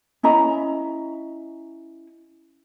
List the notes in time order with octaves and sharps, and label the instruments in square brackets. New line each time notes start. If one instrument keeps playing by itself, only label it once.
[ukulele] C#4 E4 D#5 A#5